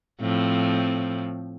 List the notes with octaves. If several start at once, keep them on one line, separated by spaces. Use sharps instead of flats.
A2 F3 C4